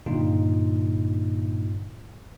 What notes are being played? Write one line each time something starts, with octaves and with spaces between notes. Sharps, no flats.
G2 A#2 D3 A#3 D#4 F4